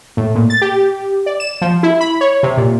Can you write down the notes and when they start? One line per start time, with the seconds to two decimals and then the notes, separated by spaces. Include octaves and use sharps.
0.17 A2
0.35 A#2
0.50 A6
0.62 G4
1.26 D5
1.40 E7
1.61 F3
1.83 E4
2.01 B5
2.21 C#5
2.43 C3
2.57 A#2